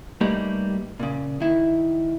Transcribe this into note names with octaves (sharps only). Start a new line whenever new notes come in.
G3 A3 A#3 D#4 G4 B4
A#2 C#3
D#3 E4